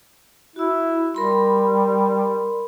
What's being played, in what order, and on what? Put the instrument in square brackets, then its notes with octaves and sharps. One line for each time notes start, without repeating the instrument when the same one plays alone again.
[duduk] E4 [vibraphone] F#4 E6
[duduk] G3 [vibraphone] A#4 B5 C6